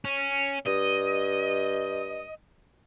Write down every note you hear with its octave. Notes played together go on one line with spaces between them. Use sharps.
C#4
G2 D#5